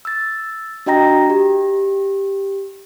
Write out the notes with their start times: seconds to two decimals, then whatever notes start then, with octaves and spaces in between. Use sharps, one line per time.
0.05 E6 A6
0.86 D4 F#4 D#5 G5 A#5 A#6
1.30 G4